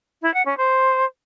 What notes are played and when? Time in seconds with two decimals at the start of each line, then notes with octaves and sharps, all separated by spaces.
0.22 E4
0.34 F#5
0.46 C#4
0.57 C5